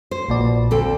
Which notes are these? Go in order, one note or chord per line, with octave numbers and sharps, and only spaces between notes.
C5
A#1 A#2 D5
D2 C4 A4